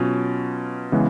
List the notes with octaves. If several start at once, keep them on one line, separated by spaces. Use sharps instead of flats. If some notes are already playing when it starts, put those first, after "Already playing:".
Already playing: B2 F#3 C#4 F4
C#3 E3 G#3 B3